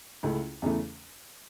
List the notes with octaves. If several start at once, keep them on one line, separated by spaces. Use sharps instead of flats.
C#2 C#3 A3 E4
E2 C#3 E3 A3